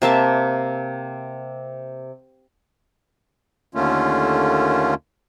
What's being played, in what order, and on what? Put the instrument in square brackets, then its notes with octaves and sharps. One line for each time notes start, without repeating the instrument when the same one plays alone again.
[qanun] C3 A#3 E5 A5
[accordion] D#2 D3 A3 A#3 C#4 F4